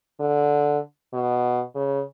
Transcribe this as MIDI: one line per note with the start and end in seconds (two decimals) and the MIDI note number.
0.20 0.78 50
1.14 1.62 47
1.75 2.02 49